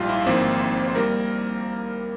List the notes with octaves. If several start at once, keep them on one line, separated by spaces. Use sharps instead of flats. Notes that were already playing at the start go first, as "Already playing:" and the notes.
Already playing: A#1 G#2 G3 F4 G4 F5 G5
E4 E5
G#1 G#2 F3 A#3 C4 C5
C5
G3 A#3 A#4